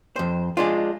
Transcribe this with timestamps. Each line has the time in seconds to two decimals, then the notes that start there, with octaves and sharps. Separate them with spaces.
0.16 F2 C5
0.57 G#3 D4 F4